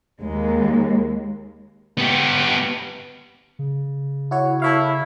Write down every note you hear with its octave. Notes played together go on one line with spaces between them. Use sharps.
D#2 G#3
B3 G4
C#3
E4 F#4 C#5
E4 A4 C#5 F5